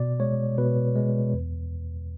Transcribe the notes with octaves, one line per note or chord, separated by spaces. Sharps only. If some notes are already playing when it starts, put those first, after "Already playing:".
Already playing: B2 D5
G#3 C#5
B2 B4
G#3
E2